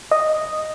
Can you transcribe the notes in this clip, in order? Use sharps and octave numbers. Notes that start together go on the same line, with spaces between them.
D#5